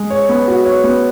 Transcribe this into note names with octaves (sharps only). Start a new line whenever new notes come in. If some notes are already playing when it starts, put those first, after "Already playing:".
Already playing: G#3
C#5
B3
F#4
C#5
B3